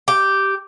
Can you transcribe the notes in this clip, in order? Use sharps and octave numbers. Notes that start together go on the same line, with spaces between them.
G4